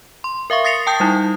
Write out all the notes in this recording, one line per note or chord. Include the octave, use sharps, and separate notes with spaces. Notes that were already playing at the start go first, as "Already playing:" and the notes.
C6
A#4 E5 F5 C#6
D#6 A6 A#6 C7 C#7 F7
G5 A5 D#6 G6
G3 D#4 E4